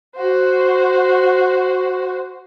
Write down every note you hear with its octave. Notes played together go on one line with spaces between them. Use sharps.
F#4 C5